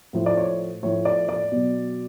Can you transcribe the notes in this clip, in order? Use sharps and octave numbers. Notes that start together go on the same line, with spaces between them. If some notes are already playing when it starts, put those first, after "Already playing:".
A2 F3
D5
C#5
A2 F3 C#5
D5
D5
B2 F#3